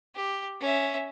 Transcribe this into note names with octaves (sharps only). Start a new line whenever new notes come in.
G4
C#4 E5